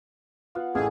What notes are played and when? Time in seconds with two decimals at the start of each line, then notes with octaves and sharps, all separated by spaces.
0.55 B3 F4 F5 F#5
0.75 A1 A2 G#4 A4 F5 G#5 E6